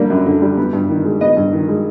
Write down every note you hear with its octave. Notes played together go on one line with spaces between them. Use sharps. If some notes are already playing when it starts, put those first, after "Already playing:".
Already playing: D3 G3 A#3
F#2
D3
G3
B3
G2
D#3
G#3
B3 D#5
G2
D#3
G#3